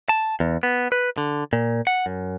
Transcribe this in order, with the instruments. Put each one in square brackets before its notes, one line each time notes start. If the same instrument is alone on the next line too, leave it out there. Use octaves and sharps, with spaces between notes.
[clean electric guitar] A5
E2
B3
B4
D3
A#2
F#5
F#2